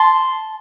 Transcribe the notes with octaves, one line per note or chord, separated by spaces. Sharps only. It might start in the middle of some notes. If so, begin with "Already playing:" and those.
Already playing: A5 C6